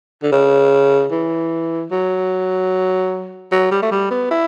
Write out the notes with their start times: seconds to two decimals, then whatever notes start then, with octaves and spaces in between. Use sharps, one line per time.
0.23 D3
0.32 C#3
1.12 E3
1.91 F#3
3.52 F#3
3.71 G3
3.82 A3
3.91 G3
4.11 B3
4.31 E4